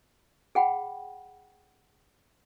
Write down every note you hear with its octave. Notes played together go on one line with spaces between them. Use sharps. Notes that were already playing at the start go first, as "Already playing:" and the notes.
G#4 F#5 G5 B5